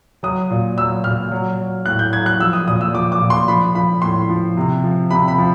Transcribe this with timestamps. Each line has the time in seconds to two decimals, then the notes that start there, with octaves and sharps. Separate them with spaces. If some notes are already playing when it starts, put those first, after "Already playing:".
0.23 F#3 D#6
0.50 A#2
0.78 F#3 E6
1.04 A#2 F6
1.32 F#3
1.59 F#3
1.86 A2 F#6
1.99 G6
2.12 F#3 G#6
2.26 F#6
2.39 F3 E6
2.53 D#6
2.67 A#2 D#6
2.81 E6
2.94 F3 D6
3.12 D6
3.21 A#2
3.30 C6
3.48 F3 B5
3.75 F3 B5
4.02 A2 C6
4.29 F3
4.57 C3
4.84 F3
5.11 C3 B5
5.28 B5
5.38 F3